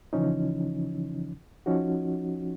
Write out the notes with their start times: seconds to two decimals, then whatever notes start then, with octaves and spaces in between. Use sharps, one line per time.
0.13 C#3 E3 F3 C#4 D#4
1.66 F3 C#4 D#4 F#4